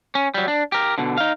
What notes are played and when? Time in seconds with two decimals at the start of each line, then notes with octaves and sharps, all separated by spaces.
0.15 C#4
0.34 F#3 G3
0.48 D4
0.72 G4 A#4
0.98 B2 D3
1.18 D#4 F5